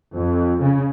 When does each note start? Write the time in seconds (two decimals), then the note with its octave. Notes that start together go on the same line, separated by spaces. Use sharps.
0.15 F2
0.62 C#3